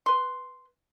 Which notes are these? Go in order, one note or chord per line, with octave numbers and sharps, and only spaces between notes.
B4 C6